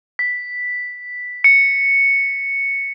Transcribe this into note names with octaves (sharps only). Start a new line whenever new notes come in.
B6
C#7